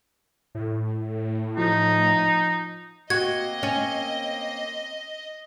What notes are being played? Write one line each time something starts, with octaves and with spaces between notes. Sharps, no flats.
A2
F3 D#4
A#3 C4 F#4 D#5 G#6
C#4